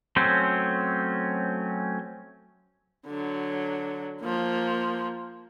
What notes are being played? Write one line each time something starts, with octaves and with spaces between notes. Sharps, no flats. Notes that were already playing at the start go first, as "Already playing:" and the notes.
F#3 A3 C4 C#4 C5
D3 F#3
F3 A#3